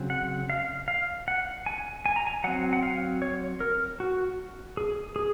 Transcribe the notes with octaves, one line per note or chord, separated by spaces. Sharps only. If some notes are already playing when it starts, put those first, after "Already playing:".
Already playing: C#3 F#3 C4
F#5
F5
F5
F#5
G#5
G#5
A#5
G#5
F#3 C4 F#5
F#5
F5
C#5
A#4
F#4
G#4
G#4